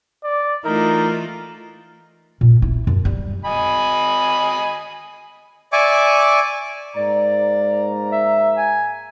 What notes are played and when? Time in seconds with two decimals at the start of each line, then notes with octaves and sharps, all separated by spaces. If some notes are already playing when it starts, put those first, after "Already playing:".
0.24 D5
0.65 E3 A3 D#4 F4 A#4
2.41 A#2
2.62 E4
2.87 F#2
3.05 G3
3.45 D#5 G#5 B5
5.73 D5 E5 G#5 C#6 D6
6.96 G#2 A#3 D5 A#5
8.12 E5
8.57 G#5